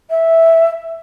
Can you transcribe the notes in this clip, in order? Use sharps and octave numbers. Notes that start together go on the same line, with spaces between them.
E5